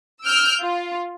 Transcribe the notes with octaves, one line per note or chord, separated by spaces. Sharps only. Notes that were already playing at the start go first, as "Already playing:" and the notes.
E6 F6 G6 D7
F4